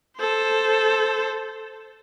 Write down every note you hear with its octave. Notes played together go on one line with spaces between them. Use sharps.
A4 C5